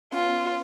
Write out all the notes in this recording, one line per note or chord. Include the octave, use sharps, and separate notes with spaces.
B3 C#4 F4